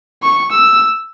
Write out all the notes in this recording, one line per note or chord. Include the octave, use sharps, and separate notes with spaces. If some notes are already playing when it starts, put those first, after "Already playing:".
C#6
E6